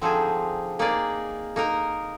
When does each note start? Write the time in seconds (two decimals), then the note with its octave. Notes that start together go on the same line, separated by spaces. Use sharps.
0.02 D3 F3 C4 D#4 G#4
0.79 A#3 D#4 G#4 D5
1.56 A#3 D#4 A#4